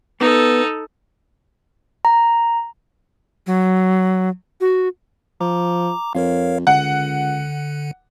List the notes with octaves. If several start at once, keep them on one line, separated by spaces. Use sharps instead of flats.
B3 D#4 A4
A#5
F#3
F#4
F3 A#5 D6
F2 A#4 C#5 F5
C#2 D3 F#5